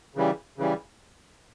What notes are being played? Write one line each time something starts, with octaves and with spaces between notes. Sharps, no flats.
C#3 E3 G3
C#3 E3 G3